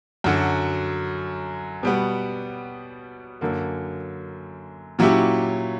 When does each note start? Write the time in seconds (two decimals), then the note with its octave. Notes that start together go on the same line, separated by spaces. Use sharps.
0.24 F#2 D3 F#3
1.83 B2 G3 B3
3.41 F#2 D3 A#3
4.99 A#2 F#3 C#4 E4 G4